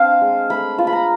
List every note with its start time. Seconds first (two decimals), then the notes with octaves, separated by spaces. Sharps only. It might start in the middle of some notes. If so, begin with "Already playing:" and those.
Already playing: C4 D4 F5
0.21 G#3
0.50 A3 B5
0.78 F4
0.87 B5
0.93 A#5